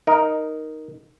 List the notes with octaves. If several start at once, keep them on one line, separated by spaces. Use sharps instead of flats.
D#4 A#4